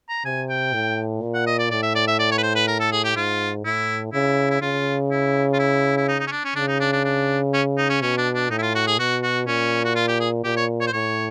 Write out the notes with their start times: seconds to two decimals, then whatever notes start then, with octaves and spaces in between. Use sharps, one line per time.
0.09 A#5
0.25 C3 G#5
0.49 G5
0.74 A2
1.22 A#2
1.34 F#5
1.47 D#5
1.59 D5
1.71 A2 D5
1.83 E5
1.95 D5
2.07 E5
2.19 D5
2.31 C#5
2.38 B4
2.43 C5
2.55 B4
2.67 A#4
2.80 A4
2.92 G#4
3.04 G4
3.16 G#2 F4
3.65 A2 E4
4.13 C#3 E4
4.50 E4
4.62 C#3 F4
5.11 E4
5.54 F4
5.59 E4
5.97 E4
6.08 D#4
6.20 D#4
6.27 C#4
6.31 D4
6.45 C#4
6.56 C#3 D4
6.68 D#4
6.80 D4
6.92 D4
7.05 D4
7.54 C#4
7.78 D#4
7.89 C#4
8.02 B2 C#4
8.18 D4
8.35 D4
8.50 A2 D#4
8.59 E4
8.62 F4
8.75 F#4
8.87 G#4
8.99 B2 F#4
9.23 F#4
9.47 A#2 C#4
9.85 F#4
9.96 F4
10.08 G4
10.20 G#4
10.44 A#2 G4
10.57 C#5
10.81 C#5
10.87 C5
10.93 A2 C#5